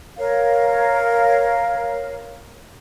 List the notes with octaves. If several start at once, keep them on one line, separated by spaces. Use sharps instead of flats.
A#4 C#5 F5